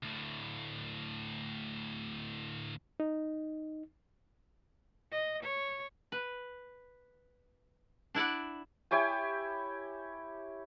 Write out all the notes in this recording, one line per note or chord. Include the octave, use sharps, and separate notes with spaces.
D2 A2
D#4
D#5
C#5
B4
D4 E4 D5 F#5
E4 G4 C#5 G#5